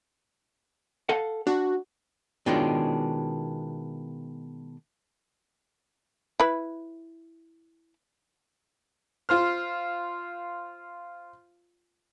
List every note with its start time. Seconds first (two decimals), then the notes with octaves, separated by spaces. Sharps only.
1.09 A4 F5 F#5
1.47 D4 F#4
2.46 B2 D#3 G#3 C#4 D4 F4
6.40 E4 B4
9.29 F4 C5 F6